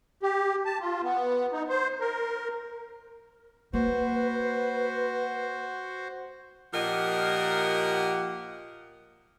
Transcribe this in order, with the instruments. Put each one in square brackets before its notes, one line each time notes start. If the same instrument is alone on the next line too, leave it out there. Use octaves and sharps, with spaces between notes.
[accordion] G4
A5
F4
B3
D#4
C5
A#4
[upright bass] A#3 [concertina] F#4 C5 [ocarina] B4
[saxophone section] A#2 F3 G4 A#4 D#5 F#5